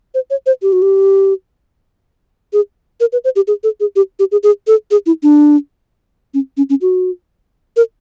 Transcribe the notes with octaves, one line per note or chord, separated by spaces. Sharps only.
C5
C#5
C5
G4
F#4
G4
G#4
A#4
B4
C5
G4
G#4
A4
G#4
G4
G4
G#4
G#4
A4
G#4
E4
D4
C#4
C#4
C#4
F#4
A#4